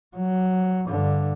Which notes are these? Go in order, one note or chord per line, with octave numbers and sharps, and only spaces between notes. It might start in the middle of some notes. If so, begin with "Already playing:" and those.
F#3
G2 D3